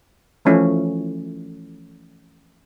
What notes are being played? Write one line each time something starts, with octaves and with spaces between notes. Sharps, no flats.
E3 F3 A3 C#4 E4